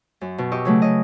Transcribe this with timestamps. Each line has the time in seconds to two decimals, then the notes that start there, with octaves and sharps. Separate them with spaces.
0.21 F#2
0.38 B2
0.52 G4 D#5 C#6 E6
0.65 C#3 F#3 A3
0.82 C#3 D#5